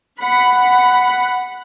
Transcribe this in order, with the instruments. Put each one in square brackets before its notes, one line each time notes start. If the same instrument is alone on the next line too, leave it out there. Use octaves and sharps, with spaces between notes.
[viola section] F#5 B5